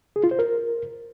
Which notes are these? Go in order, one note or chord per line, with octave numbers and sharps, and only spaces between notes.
G#4
F4
C5
A#4